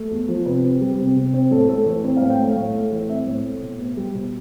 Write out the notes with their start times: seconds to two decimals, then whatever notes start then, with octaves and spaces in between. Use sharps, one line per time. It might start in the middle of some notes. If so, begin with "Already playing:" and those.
Already playing: A3
0.11 E2
0.28 F3
0.46 C3 B4
0.64 C4
0.81 G3
0.99 C3
1.16 C3
1.33 C4
1.51 A2 A4
1.69 A3 A4
1.86 E3 A4
2.04 C4 B4
2.17 F5
2.21 A2
2.30 G5
2.39 A3 F5
2.56 A2
2.74 A3
2.91 E3
3.09 C4 E5
3.27 A2
3.44 A3
3.62 B2
3.79 B3
3.97 G3
4.15 B2